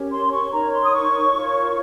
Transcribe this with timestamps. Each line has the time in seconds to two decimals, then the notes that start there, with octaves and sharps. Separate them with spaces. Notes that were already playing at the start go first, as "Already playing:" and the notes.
Already playing: C#4 G4 A#4 C#5
0.12 C6
0.32 C#6
0.52 D#4 A#4 C#5 A#5
0.72 C6
0.83 D#6
0.93 C#6
1.34 F4 A#4 C#5